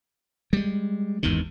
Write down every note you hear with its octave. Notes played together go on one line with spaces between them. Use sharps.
G3 G#3
G#1 E2 G2 D#3